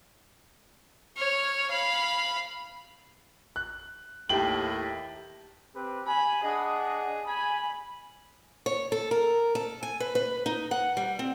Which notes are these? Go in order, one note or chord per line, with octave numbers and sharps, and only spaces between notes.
C#5 F6
F5 B5
F#6
D#2 A2 G4 G5 F#7
C4 G4 B4
G#5 B5
D4 G#4 D#5 F#5
G#5 B5
C#5
A4
A#4
A4
G#5
B4
B4
D#4
F#5
G3
C4